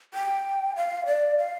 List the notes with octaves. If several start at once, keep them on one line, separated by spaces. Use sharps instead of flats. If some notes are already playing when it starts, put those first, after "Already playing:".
G5
F5
D5
F5